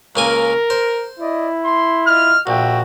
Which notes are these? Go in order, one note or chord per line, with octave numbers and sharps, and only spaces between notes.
C#2 A#3 A#4 G#5
C5
E4 D5 D#5
C6
F4 D#5 F6
A#1 F#4 E5 G5